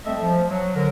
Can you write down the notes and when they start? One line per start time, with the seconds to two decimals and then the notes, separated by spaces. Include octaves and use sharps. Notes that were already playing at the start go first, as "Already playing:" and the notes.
0.06 G3 A3 C4 A4 D#5 E5
0.21 F3
0.48 F#3
0.76 D3 A#4